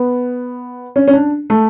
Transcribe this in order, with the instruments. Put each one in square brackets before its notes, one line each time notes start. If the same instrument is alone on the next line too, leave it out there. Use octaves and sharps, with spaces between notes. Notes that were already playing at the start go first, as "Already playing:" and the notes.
Already playing: [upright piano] B3
C#4
C#4
D4
A3